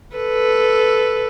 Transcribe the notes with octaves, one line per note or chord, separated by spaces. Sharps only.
A4 B4